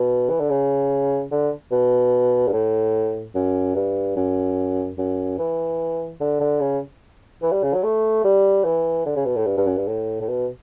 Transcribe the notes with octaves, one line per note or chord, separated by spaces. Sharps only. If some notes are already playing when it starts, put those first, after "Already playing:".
Already playing: B2
E3
D3
C#3
D3
B2
G2
A2
F#2
G2
F#2
F#2
E3
D3
D3
C#3
E3
G3
C#3
F#3
A3
G3
E3
D3
C#3
B2
A2
G2
G2
F#2
G2
A2
A2
B2